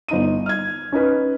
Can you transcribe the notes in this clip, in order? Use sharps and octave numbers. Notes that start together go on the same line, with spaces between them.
G1 D#4 D#7
F6 G#6
C#4 D#4 B4